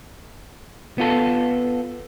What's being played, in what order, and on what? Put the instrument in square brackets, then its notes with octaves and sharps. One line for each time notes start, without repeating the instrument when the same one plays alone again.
[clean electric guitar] B3 F4 A4